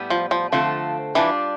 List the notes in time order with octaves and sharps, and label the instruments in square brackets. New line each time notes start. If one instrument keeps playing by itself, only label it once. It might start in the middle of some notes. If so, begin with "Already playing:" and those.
Already playing: [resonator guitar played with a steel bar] A2 G3 B3
[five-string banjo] F3
F3
[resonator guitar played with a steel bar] D3 A3 C4 F4 A4 [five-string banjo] F3
[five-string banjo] E3 [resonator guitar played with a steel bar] G3 D4 F4